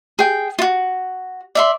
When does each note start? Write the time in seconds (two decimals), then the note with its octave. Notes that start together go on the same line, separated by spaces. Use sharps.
0.19 G#4 G5
0.59 F4 F#4
1.55 D5 E5 C6